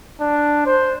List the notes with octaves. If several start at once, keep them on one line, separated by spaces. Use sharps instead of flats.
D4
C5